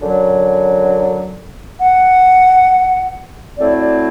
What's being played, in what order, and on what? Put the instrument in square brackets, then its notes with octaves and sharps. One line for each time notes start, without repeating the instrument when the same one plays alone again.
[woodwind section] F#2 D3 F#3
[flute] F#5
[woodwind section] F#3 A3 C4 E4 [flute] D5
[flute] D5